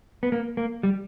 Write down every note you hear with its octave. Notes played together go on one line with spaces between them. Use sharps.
B3
A#3
A#3
G3